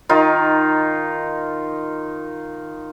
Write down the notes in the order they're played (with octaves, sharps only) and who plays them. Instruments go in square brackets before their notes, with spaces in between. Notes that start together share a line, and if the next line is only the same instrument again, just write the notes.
[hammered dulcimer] D#3 D#4 F4